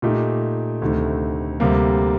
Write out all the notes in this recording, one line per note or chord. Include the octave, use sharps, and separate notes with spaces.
A#2 A3 D#4 G4
D2 C3 D#3 A3
D2 C3 G3 A#3